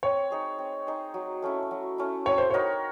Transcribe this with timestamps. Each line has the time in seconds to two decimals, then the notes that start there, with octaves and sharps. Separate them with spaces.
0.03 C4 C#5
0.31 D#4 G#4 C5
0.59 C4
0.87 D#4 G#4 C5
1.14 F#3
1.42 A3 C#4 E4
1.71 F#3
1.98 A3 C#4 E4
2.26 C4 C#5
2.38 C5
2.50 D#4 F#4 A#4 C#5